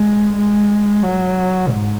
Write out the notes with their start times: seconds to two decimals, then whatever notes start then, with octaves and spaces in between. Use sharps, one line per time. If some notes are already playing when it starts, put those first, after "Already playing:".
Already playing: G#3
0.36 G#3
1.03 F#3
1.69 G#2